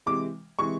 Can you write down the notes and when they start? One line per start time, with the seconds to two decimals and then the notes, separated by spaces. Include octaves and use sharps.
0.06 C3 E3 G#3 D6
0.58 C3 E3 G#3 C#6